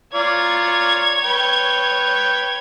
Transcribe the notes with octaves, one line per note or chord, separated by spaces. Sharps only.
F4 C#5 D5 A#5 G#6
B4 G5